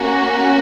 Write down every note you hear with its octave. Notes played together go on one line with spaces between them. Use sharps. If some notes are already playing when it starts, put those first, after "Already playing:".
Already playing: A#3 C#4 F#4